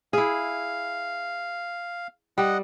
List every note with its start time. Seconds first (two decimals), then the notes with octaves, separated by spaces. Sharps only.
0.13 E4 G#4 F5
2.38 G3 D#5 F#5